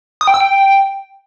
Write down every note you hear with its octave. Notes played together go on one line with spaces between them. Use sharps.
D#6
G5
E6
G5